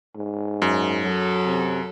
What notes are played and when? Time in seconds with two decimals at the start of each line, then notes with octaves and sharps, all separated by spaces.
0.16 G#2
0.62 F#2
1.02 F#3 A4
1.46 C3